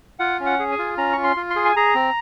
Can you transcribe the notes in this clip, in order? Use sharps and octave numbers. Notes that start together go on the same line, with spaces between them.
F4 F#5
C#4
F#5
G#4
G#5
F4
C#4 A#5
F4 C#6
C6
F4
C6
G#4
G#5
G#4 A#5
C4